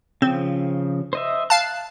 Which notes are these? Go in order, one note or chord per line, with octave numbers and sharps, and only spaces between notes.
C#3 F3 C4
C5 D#5 E5
F5 A5 F#6